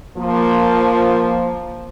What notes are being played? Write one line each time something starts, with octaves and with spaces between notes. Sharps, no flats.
F3 A#3